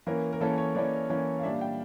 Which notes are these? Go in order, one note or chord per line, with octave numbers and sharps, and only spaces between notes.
E3 A#3 C#4 A#4
A#4
E3 A#3 C#4 A4
C#5
E3 A#3 C#4 D5
E3 A#3 C#4
F5
A#2 G3 D4 E5
F5
G5